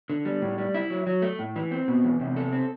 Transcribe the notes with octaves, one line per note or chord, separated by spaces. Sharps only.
D3
G3
A2
G3
E4
F#3
F#3
A3
A2
E3
C4
B2
E2
C3
A4
C4